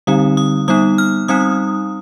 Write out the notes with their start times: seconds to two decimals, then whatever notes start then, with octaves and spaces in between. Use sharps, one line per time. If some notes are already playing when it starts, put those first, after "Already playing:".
0.07 D3 G3 C4 D#4 D#6
0.37 D#6
0.68 G3 B3 D#4 D#6
0.98 F6
1.28 G3 C4 D#4 D#6